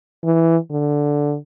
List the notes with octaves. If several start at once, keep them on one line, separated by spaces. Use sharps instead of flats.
E3
D3